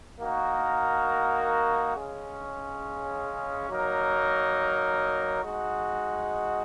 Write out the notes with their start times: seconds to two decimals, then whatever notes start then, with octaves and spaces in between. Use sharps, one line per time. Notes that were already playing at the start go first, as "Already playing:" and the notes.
0.19 A#3 D#4 F#4 A#4
1.94 C#3 G#3 C#4
3.68 F#3 A#3 D#4 A#4
5.43 G#3 D#4 F#4